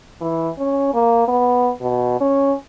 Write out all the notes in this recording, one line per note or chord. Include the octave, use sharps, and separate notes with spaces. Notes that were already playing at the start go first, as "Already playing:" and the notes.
E3
C#4
A#3
B3
B2
C#4